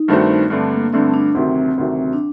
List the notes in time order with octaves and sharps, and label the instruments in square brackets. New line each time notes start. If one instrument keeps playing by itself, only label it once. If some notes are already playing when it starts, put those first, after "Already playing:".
Already playing: [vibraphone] D#4
[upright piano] G2 D#3 A3 C4 F#4
[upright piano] G2 D3 A3 [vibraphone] C4
[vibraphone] A#3
[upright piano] G2 D3 A3 [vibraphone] C4
[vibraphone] D4
[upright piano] D2 C3 D#3 F#3 [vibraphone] C4
[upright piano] D2 C3 D#3 F#3
[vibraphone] D4